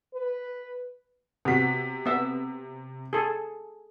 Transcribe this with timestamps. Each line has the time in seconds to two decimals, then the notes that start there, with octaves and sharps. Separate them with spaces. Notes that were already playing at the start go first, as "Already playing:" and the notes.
0.14 B4
1.45 C3 B3 F#4 B6
2.06 B3 E5
3.13 G#4 A4